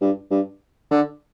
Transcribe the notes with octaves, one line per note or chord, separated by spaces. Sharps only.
G2
G2
D3